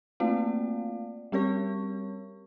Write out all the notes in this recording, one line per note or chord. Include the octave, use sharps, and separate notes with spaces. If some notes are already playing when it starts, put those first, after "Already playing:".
A3 A#3 C4 F4 D5 F5
G3 C4 G4 A#4 C#5 C#6